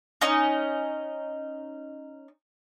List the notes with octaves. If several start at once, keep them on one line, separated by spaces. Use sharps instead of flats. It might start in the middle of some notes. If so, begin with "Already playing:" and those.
C#4 D#4